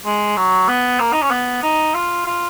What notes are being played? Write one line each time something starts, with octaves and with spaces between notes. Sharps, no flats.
G#3
F#3
B3
A#3
D#4
C#4
B3
D#4
F4
F4